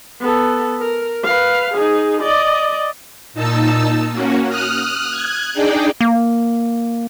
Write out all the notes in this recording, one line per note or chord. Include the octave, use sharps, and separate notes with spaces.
B3 A4
A#4
B4 F5
D#4 G#4
D5 D#5
A#2 D#4 A5 E6
A#3 C#4 F#4
D#6 F6 F#6
F#6 G#6
D4 D#4 G#4 D5 G5
A#3